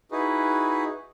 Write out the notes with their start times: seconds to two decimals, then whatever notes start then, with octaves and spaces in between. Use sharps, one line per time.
0.11 D#4 E4 F#4 G#4 B4